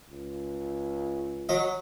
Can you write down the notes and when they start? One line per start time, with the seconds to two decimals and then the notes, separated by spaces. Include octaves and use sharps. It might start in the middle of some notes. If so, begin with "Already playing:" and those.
0.11 C#2
1.49 F#3 D#5